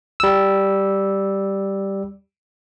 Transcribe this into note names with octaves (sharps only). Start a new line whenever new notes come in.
G3 E6